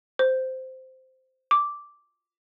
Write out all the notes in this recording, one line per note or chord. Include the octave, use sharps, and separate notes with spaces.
C5
D6